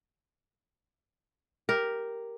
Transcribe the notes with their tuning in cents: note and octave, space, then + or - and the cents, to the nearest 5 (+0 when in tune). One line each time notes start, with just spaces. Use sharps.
G4 +0 A#4 +0